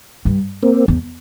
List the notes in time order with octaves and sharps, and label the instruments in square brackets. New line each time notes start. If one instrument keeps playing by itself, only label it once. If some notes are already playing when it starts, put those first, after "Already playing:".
[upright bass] G2
[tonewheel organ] A#3 C4
[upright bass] E2